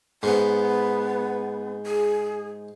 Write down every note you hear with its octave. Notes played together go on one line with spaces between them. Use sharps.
G#2 B3
G#4